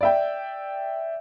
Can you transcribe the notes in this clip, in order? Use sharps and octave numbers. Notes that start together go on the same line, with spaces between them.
D5 E5 G5